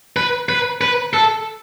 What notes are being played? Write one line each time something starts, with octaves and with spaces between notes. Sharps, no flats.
B4
B4
B4
A4